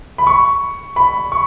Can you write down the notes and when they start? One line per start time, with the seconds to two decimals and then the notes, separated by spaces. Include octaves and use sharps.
0.18 B5
0.27 C#6
0.96 B5
1.32 C#6